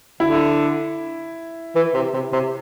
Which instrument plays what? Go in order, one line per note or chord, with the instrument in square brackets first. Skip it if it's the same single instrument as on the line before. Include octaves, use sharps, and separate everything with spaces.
[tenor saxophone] D3 [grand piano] E4
[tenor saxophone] E3
C3
C3
C3